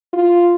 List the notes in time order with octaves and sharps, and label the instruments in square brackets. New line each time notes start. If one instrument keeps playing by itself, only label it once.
[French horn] F4